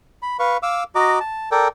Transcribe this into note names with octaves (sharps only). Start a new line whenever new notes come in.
B5
B4 F5 C#6
F5 D6 E6
F#4 D#5 A#5 D6
A5
A4 A#4 D5 G5